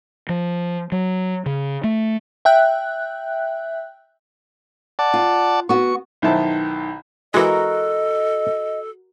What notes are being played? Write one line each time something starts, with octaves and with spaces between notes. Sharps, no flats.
F3
F#3
C#3
A3
E5 G5 F#6
D5 F#5 A5
F4
B3 F#4 C#6
B1 D#3 E4 C5 E5 A5
E3 G#3 F#4 A4 A#4 D#5